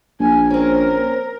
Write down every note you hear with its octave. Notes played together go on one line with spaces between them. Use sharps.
A#1 G#5
C4 C#4 A#4